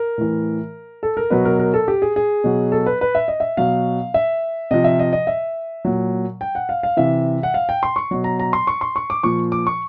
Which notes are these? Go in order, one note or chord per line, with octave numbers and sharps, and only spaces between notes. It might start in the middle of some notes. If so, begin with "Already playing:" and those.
Already playing: A#4
A2 E3
A4
A#4
B2 F#3 B4
A#4
A#4
A4
G4
G#4
G#4
B2 F#3
A4
B4
B4
E5
D#5
E5
B2 F#3 F5
E5
C3 F3 D#5
E5
D#5
D#5
E5
A#2 F#3
G5
F#5
F5
F5
C3 E3 E5
F#5
F5
G5
C6
C#6
B2 F#3
A#5
A#5
C6
C#6
C6
C#6
D6
A#2 F3 C#6
D6
C#6